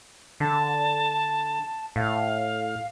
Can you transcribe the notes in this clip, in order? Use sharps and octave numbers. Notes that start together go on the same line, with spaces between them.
D3 A5
A2 F5